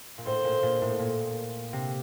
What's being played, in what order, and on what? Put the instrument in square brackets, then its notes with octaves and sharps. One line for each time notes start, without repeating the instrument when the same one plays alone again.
[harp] A#2
[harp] A2 [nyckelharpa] C5
[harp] A#2
A#2
A2
A#2
C3